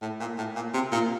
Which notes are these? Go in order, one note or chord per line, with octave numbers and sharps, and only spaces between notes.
A2
A#2
A2
A#2
C3
A#2